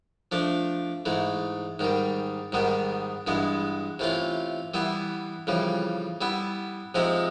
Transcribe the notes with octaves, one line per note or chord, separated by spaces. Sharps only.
F3 A3 D4
G#2 E3 A3
G#2 D#3 G3
G#2 D#3 G3 B3
G2 E3 G#3 B3
C3 E3 A3 C#4 F4
E3 G3 B3 E4
F2 C#3 E3 G3
G3 B3 E4
C3 F3 G#3 C4 D#4